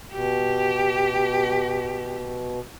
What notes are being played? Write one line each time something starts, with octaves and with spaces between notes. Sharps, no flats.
B2 G4